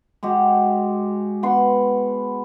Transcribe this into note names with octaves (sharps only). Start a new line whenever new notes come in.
G#3 F#4 G4
B3 F#5 C6